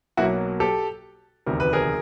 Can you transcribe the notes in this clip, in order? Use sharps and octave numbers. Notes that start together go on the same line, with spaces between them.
B1 B2 F#3 A#3 E4 F#4
G4 A4
E1 D2 C3 D#3 A#4
B4
G#4 A#4